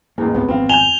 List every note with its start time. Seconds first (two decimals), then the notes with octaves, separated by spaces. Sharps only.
0.18 A1 E2 A#3
0.34 C#2 G#2 B3 C4
0.48 G#1 F2 C4 F5
0.69 G#5 G6 E7 F7 G7